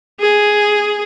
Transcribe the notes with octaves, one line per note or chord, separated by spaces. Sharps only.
G#4